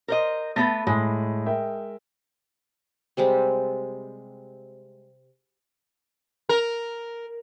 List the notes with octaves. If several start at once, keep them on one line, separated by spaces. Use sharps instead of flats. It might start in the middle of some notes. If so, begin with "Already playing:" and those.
A#4 C5 D#5
A3 B3 A4 A#6
A2 G#3
A#4 E5 G5
C3 G3 G#3 C4
A#4